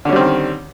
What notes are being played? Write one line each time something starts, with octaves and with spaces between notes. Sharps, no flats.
D3 D#3 G3 C4 C#4